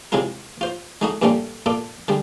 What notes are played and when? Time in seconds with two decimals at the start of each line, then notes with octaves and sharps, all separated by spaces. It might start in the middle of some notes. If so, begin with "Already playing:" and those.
0.12 C3 F#3 G#3 E4 F4 A#4
0.61 F4 C5
1.01 G#3 A3 D#4 F#4 D#5
1.22 G2 A#2 G3 A3 A#3 C#4
1.66 A#2 F4 A4 D6
2.08 D3 G3 G#3